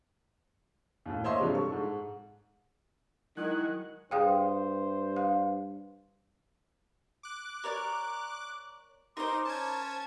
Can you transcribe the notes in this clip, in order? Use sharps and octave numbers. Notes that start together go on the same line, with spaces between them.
D#2 A2
C5 C#5 D#5 E5 C6
G2 C3 F3 G3 G#3
A4 C#6
G#2
D#3 F#3 G#3 E4 F#5
G2 G#4 C5 F5 G5
F5
D6 F#6
A#4 C#5 D5
D#4 A#4 C5 C6 D6
C#4 A5 G#6